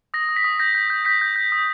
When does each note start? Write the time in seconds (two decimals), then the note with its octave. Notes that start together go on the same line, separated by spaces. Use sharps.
0.14 D#6 A#6
0.29 D#6
0.36 B6
0.44 D#6
0.60 G6 A#6
0.75 G6
0.90 G6
1.05 G6 B6
1.21 G6
1.36 G6
1.52 D#6